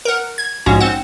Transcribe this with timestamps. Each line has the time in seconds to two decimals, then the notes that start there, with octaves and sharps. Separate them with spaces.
0.05 A#4 F#5
0.38 G#6
0.66 A#1 G#2 C#4 F#4
0.81 C4 F#5